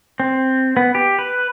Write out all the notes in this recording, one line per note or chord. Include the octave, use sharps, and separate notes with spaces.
C4
B3
G4
B4